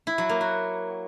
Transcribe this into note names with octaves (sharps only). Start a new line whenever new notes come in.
E4
F#3
A#3
F#4